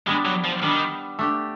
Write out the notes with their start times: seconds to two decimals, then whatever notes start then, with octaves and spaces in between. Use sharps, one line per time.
0.07 G3 G#3 B3 D4
0.26 F#3
0.44 F3
0.63 D#3 G3 B3 D4
1.19 A3 D4 G4